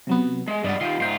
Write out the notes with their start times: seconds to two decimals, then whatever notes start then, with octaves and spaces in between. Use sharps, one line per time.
0.07 C3 F#3 B3
0.48 G#3
0.64 G2 G#3 F#4 D5 D#5
0.81 D#3 F4 C6 G6
1.00 G#2 F4 G5 C6